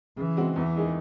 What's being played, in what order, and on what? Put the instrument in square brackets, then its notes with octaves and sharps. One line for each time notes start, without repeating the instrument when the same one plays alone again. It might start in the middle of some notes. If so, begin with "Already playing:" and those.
[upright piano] C#3 [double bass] E3
[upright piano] G#3 C4 F#4
[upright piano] E2 [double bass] E3
[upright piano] D#3 G#3 D#4 G#4